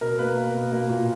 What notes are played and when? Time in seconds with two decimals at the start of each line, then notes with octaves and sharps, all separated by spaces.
0.01 B2 A#4
0.19 A#3 B4
0.37 A#3
0.54 B2
0.72 A#3
0.89 A#2